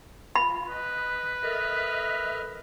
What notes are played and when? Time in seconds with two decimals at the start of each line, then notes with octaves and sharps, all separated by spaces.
0.35 F4 B5
0.68 B4 D#5
1.43 A4 A#4 D#5 E5 F6